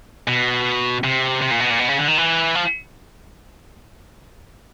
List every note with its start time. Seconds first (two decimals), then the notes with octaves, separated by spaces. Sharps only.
0.28 B2
1.04 C3
1.42 C3
1.51 A#2
1.60 B2
1.70 A#2
1.80 B2
1.89 C#3
1.98 D3
2.08 D#3
2.18 E3
2.55 F3